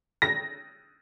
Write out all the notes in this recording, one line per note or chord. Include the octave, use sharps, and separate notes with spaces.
A#6